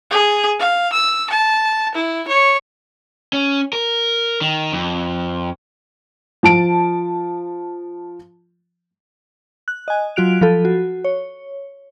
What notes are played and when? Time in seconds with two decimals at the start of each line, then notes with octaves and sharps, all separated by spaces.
0.11 G#4
0.59 F5
0.93 E6
1.30 A5
1.94 E4
2.28 C#5
3.33 C#4
3.73 A#4
4.41 D#3
4.72 F2
6.43 F3 A5 D7
9.68 F#6
9.88 D#5 G#5
10.16 F#3 F4 F#4 F#6 D7 F7
10.41 F3 F4 A4
10.65 F#4
11.04 C#5